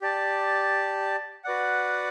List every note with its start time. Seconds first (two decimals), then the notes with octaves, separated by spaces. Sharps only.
0.02 G4 D5 A5
1.44 F#4 B4 D5 F#5